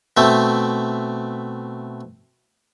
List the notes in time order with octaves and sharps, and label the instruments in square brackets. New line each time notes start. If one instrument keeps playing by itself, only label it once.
[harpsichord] B2 A3 C4 E5